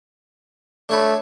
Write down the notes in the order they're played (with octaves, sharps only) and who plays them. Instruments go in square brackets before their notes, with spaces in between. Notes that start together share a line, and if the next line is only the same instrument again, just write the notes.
[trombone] A3 [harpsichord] D4 C#5 B5